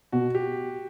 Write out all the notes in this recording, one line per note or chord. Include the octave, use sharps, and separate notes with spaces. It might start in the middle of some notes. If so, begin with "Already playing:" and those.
B2 F#4
G4